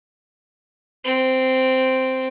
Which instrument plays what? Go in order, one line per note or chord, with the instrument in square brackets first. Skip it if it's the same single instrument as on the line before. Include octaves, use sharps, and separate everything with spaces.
[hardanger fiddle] C4